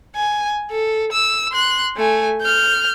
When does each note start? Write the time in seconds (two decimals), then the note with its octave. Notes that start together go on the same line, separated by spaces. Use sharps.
0.15 G#5
0.71 A4
1.12 E6
1.52 C6 F#6
1.97 A3 G#5
2.41 F6 G6